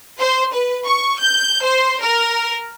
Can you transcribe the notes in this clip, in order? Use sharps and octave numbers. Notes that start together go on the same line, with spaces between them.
C5
B4
C#6
G6
C5
A#4